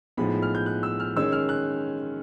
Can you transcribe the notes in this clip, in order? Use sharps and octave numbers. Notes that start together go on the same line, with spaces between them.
A2 F3 G#3 B3 D#4 B5
B5
F6
G6
F#6
E6
F6
D#3 G#3 C#4 E6
F6
F#6